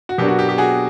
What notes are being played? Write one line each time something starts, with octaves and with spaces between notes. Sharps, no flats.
F#4
B2 F#3 A#3 D4 G4
F#4
G4
G4
F#4 G#4